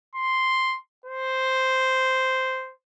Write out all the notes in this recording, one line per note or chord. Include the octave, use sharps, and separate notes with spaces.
C6
C5